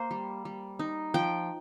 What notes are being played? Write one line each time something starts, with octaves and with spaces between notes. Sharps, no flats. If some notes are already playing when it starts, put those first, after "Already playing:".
Already playing: A#3 C5
G3
G3
D#4
F3 G5